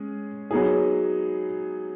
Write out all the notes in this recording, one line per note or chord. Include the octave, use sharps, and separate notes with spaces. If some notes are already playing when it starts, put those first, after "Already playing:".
Already playing: G#3 C#4 G#4
F#3 B3 D#4 G#4